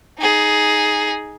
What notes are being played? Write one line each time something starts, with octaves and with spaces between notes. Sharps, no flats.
D#4 G#4